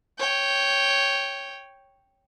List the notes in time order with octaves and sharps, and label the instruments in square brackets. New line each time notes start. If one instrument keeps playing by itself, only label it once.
[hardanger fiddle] C#5 G5